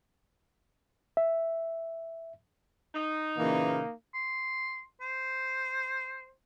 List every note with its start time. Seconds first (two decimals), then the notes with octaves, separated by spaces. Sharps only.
1.17 E5
2.95 D#4
3.37 A#2 C#3 E3 A#3
4.14 C6
5.01 C5